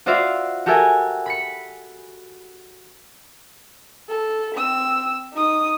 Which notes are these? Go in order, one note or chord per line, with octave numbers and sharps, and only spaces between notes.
F4 F#4 C5 D5 E5 F5
F#4 G4 A4 A#4 E5 G#5
B5 B6 C#7
A4
C4 E6
D#4 D#6